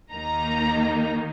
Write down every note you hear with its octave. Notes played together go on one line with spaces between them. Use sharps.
D#2 D#3 A#3 D#4 A#5